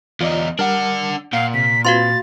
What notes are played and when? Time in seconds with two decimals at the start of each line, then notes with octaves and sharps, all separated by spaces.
0.21 E2 D#4 F4 D5
0.59 G3 D4 A#4 F#5 F6
1.33 A#2 F5 F#5
1.54 C3 B6
1.85 C4 F4 F#4 B4 F5 C6 A6